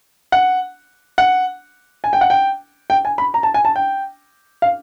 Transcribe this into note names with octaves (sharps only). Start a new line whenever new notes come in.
F#5
F#5
G#5
G5
F#5
G5
G5
G#5
B5
A#5
A5
G#5
A5
G5
F5